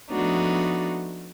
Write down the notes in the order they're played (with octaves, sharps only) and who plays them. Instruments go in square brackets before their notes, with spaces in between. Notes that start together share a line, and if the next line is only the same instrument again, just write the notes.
[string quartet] F3 A3 B3 D4 D#4 F#4